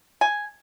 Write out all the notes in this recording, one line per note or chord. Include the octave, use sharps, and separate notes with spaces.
G#5